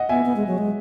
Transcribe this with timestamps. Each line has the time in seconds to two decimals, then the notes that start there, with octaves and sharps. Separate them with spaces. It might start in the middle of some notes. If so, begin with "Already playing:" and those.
Already playing: D#5 F#5
0.09 B3 E5 G#5
0.26 B3
0.36 G#3
0.47 F#3
0.58 G#3